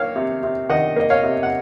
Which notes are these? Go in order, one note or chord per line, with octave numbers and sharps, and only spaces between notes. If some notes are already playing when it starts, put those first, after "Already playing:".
Already playing: D#3 A#3 C#5 F5
C3
C3
D#3 D#5 F#5
A#3 D#5
C#5 F5
C3
F#5